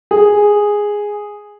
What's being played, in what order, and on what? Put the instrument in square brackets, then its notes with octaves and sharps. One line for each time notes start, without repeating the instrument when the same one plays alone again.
[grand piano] G#4